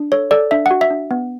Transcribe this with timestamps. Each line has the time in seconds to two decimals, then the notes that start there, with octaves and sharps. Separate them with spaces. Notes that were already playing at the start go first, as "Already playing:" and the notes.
Already playing: D4
0.12 A4 C#5
0.31 A4 D5
0.51 D4 E5
0.66 F#5
0.71 F#4
0.81 E5
0.90 D4
1.11 B3